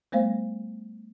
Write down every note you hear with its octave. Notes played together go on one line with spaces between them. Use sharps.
G3 A3 B3 C5 F5